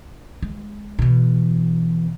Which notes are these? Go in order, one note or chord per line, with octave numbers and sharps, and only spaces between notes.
G#3
B2 E3